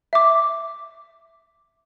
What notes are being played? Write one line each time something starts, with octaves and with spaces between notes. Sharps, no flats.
E5 D6